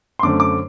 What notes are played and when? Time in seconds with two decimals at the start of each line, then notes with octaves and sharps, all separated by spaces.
0.19 C6
0.23 F#2 D3 A3 C4 D6
0.40 D6